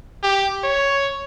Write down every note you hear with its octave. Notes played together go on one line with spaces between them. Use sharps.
G4
C#5